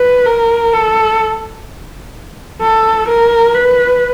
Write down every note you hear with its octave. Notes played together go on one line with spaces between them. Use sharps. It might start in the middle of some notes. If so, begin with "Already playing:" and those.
Already playing: B4
A#4
A4
A4
A#4
B4